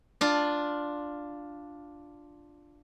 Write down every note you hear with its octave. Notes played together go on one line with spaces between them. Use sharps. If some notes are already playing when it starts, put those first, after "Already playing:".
D4 F4